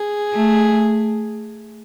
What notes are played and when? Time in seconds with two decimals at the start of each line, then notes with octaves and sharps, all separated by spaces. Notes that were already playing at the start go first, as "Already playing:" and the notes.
Already playing: G#4
0.34 A3